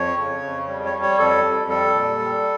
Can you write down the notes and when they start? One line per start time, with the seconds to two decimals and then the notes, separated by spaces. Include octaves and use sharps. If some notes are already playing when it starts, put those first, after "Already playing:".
Already playing: F2 C#5
0.18 C#3
0.43 F2
0.68 G3
0.85 C#5
0.93 G3
1.02 C#5
1.19 F2 A4
1.44 F2
1.69 G3 A4
1.94 A#2
2.19 G3